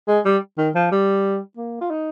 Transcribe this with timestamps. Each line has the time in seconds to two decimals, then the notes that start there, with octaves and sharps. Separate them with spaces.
0.08 G#3
0.25 G3
0.58 D#3
0.75 F3
0.91 G3
1.57 A#3
1.81 F4
1.91 D#4